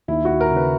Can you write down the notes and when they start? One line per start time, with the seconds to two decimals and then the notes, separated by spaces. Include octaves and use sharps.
0.08 D#2 E4
0.25 F#4
0.30 D#2
0.41 A#4
0.51 C#3
0.56 B4